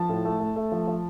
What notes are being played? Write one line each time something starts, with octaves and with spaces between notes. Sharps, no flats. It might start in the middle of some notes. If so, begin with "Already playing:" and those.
Already playing: F3 A5
A2
A3
A3
A3
F3
F3